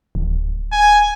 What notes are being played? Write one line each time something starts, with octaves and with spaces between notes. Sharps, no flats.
D1
G#5